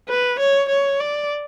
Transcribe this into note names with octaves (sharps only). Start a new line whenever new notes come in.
B4
C#5
C#5
D5